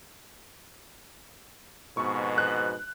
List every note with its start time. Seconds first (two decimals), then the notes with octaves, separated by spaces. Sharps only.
1.97 F2 G#2 B2 C#6
2.38 F#6